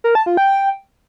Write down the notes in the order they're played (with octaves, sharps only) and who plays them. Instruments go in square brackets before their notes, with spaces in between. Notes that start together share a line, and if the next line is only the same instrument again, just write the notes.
[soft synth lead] A#4
A5
F4
G5